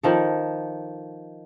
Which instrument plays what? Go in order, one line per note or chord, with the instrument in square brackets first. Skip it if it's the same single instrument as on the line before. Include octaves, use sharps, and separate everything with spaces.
[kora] D#3 F3 A4